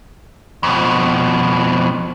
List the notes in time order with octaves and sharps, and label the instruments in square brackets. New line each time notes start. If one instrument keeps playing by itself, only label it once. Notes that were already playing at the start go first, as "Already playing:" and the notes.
[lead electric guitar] F2 B2